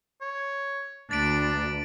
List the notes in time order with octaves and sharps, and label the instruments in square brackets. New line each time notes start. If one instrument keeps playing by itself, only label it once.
[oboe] C#5
[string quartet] D2 [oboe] D4 [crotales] A6 B6 D7